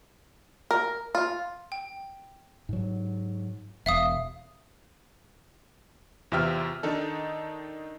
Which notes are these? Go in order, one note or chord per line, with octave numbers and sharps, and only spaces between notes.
A#4
F4
G5
G#2 F#3
E1 E5 F5 D#6
E2 C3 F4 E5 G5 F6
D#3 D4 D#4 A4